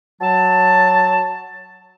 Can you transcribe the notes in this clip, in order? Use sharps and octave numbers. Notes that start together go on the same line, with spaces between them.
F#3 A5